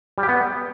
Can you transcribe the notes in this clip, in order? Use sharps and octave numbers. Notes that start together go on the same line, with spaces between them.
G3
G4
B3